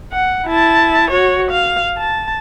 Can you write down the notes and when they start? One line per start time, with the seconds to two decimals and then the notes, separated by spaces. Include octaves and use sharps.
0.12 F#5
0.47 E4 A5
1.10 F#4 C#5
1.51 F5
1.98 A5